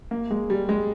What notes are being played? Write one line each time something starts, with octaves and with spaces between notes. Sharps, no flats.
A#3
G#3
G3
G#3